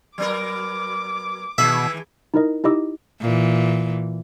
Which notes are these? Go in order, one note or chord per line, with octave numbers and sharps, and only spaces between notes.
F#3 B3 A#4 D6
B2 D#3 E3 G#4 E5
D#4 E4 A#4 D#5
D#4 E4 G4 D#5 D6 E6
A#2 E3